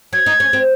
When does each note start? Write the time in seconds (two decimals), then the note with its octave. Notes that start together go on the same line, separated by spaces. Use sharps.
0.13 F#3 G#6
0.26 D#4
0.40 C#4
0.53 C4